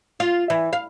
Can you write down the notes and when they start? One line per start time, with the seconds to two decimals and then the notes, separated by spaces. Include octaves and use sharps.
0.20 F4
0.50 E3
0.73 F5